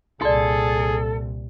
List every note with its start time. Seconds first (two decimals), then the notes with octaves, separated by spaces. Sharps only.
0.22 C2 A#2 G#4 A4 D5 C6